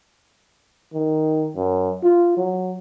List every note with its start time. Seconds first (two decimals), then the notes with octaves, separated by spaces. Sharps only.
0.93 D#3
1.56 F#2
2.03 F4
2.37 F#3